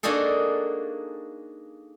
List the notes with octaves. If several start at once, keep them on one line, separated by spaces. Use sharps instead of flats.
A#3 D4 D#4 F#4 G#4 A4